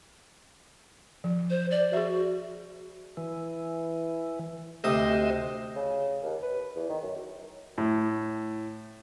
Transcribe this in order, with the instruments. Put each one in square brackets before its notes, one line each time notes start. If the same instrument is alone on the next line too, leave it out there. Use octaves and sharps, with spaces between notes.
[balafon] F3
[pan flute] C5
D5
[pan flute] F#4 [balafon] G#4 E5
[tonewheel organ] E3
[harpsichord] D2 C3 D#6 [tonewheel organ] C5 D#5
[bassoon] C#3
D#2
B4
E2
D#3
F#2
[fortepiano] A2